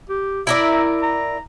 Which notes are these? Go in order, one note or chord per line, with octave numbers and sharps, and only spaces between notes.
G4
E4 A#4 D5 E5
A#5